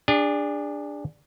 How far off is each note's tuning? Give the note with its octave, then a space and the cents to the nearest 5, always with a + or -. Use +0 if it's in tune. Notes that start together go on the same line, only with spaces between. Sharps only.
D4 +0 G#4 -35